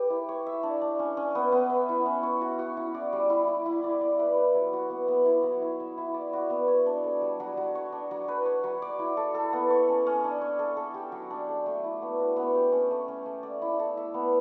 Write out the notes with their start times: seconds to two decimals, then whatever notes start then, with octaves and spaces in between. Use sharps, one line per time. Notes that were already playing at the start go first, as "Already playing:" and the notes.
Already playing: G4 B4
0.10 E4
0.29 C#5
0.47 E5
0.63 D4
0.81 D4
0.99 C#4
1.17 C#4
1.35 B3
1.52 B3
1.70 E5
1.89 E4
2.06 C#4
2.23 C#5
2.41 F#4
2.59 F#4
2.77 E4
2.94 D5
3.13 G3
3.30 E4
3.48 E4
3.66 E4
3.84 D5
4.01 D5
4.19 B4
4.37 B4
4.55 F#3
4.73 F#4
4.90 B3
5.08 B3
5.26 E4
5.43 F#3
5.62 E4
5.80 E5
5.98 E4
6.14 D5
6.33 F#4
6.50 B3
6.68 C#5
6.86 D4
7.04 A4
7.21 G3
7.40 F#3
7.57 F#3
7.75 C#5
7.92 D4
8.11 F#3
8.28 B4
8.46 C#5
8.64 F#3
8.82 D5
8.99 E4
9.17 A4
9.34 A4
9.53 B3
9.70 C#5
9.88 C#4
10.07 C#4
10.24 D4
10.42 C#5
10.59 A4
10.77 A4
10.94 G4
11.12 F#3
11.30 D4
11.49 A4
11.66 A3
11.84 E4
12.02 B3
12.20 F#4
12.36 B3
12.55 G4
12.72 C#4
12.91 A3
13.08 C#4
13.26 A3
13.43 D5
13.62 E4
13.79 A4
13.97 E5
14.14 B3